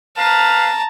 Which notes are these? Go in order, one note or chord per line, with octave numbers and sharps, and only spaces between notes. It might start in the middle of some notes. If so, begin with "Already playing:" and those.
B4 F5 A5 A#5